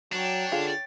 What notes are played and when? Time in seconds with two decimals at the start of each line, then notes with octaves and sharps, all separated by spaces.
0.12 F#3 D4 C#5 G5
0.52 D3 F4 G#4